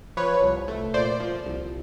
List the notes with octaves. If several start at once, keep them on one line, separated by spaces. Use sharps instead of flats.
F3 B4 C#5
C2
A3
A#2 C5 D5
F3
C2